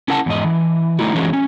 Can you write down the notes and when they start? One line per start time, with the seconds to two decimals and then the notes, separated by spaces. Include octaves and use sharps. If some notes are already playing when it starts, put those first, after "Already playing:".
0.08 C#4 E4 A#4 F#5 G5 A5
0.26 E2 G#2 D#5
0.44 E3
0.99 D3 F#3 A3 D#4 E4 F#4
1.15 E3 F#3 G#3 A#3 C#4
1.33 C#4